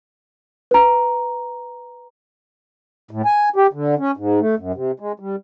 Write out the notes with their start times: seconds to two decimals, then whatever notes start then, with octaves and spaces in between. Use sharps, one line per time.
0.71 B4 A#5
3.11 A2
3.25 G#5
3.56 G4
3.73 D3
3.99 C#4
4.17 G#2
4.40 A3
4.58 F#2
4.74 C3
5.00 G#3
5.20 G3